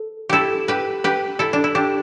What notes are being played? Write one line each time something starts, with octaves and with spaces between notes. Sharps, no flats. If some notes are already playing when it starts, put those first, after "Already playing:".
Already playing: A4
E4 G4 A4
G4 B4
G4 B4
E4 A4
D4
E4
D4 G4